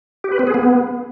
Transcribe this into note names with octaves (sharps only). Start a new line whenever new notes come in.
G4
B4
C4
G#4
B3